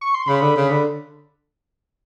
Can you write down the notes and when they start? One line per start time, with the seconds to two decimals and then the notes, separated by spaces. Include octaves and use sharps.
0.01 C#6
0.14 C6
0.28 C#3 B5
0.42 D3
0.56 C#3
0.71 D3